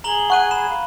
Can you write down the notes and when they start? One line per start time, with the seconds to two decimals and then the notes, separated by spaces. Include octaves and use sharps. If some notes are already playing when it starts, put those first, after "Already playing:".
0.04 G#4 A#5 F#7 G7
0.30 F#5 C#6 F#6 D#7
0.51 B5 E7
0.69 F5